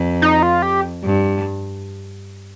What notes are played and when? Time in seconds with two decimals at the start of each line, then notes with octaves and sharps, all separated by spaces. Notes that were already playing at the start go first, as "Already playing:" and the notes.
Already playing: F2
0.22 D#4
0.43 F4
0.62 G4
1.04 G2